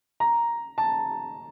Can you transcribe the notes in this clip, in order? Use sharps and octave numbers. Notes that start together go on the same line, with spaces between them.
A#5
A5